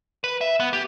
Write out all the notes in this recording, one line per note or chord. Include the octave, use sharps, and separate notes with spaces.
B4
E5
B3
G4